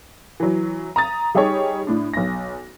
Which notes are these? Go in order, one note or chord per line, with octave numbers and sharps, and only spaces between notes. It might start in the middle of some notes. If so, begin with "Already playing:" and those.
E3 F#3
A#5 D#6 A6
G3 D#4 G4 G#4 C#5
A2 D4
B1 A#6